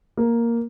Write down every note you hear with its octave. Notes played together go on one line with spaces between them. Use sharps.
A#3